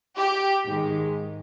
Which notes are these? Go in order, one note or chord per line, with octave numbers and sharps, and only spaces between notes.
G4
G#2 D#3 G#3